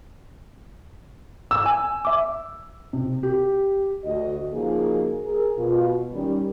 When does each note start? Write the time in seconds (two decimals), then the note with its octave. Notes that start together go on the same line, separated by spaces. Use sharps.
1.51 E6
1.66 G#5
2.05 E5 D6
2.93 C3
3.23 G4
4.04 D2 F#4 D#5
4.53 C#3 F3 A#3 D#4 F#4 G#4
5.25 G#4 A#4
5.58 B2 F4
6.13 D#3 G3 C#4